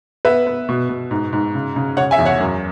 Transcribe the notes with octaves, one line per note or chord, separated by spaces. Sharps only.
B3 B4 E5
B3
B2
B2
G#2
G#2
C#3
C#3
C#3 C#5 F#5
E5 G#5
E2
C#5 F#5
F#2